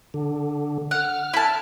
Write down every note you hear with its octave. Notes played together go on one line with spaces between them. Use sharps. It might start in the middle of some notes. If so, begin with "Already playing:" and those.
D3
F#5 F6
E4 A5